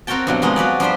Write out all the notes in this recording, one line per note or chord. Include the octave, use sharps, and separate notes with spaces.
C4 F#4 A#4 C#5 G5 A5
G2 B2 F#3
F3 F#3 G#3 A#3 B3
F#4 B4 C#5 D5
F3 G3 D4 G4 C5